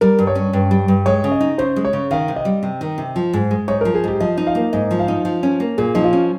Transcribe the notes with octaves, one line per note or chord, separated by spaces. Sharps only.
G3 A#4
G2
C#5
C#4
G2
G3
G2
G#3 C#5
C#3
D#5
D#4
C#3 C5
G#3
C#5
C#3
D#3 F5
C3
D#5
G3
C3
D#3
C3
F3
G#2
G#3
G#2 C#5
A#4
F3
G#4
G#2 G4
F3 D#5
D#4
F5
A#3
G#2 D#5
F3
F5
D#4
F3
C#4
A#3
A#2 G#4
F3 D#4
F4
C#4